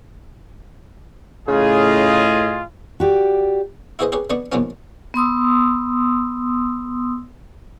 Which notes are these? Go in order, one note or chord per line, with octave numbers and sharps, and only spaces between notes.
A2 C#3 F4 G#4 D#5
F#4 G4 D5
E4 F#4 G#4 B4 C5 D#5
G4 G#4 B4 C#5
D3 B3 D4 D#5 C#6
D#2 B2 F3 F#3 B3 C#4
B3 C6 D#6 E6